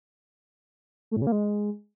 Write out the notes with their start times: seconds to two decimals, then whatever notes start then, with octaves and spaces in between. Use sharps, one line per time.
1.11 A3
1.17 A2
1.22 C#3
1.27 A#3
1.32 G#3